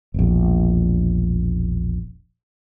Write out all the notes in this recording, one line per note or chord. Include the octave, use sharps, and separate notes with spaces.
E1 A#1